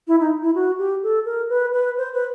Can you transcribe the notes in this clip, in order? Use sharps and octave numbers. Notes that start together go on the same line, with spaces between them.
E4
D#4
E4
F#4
G4
A4
A#4
B4
B4
C5
B4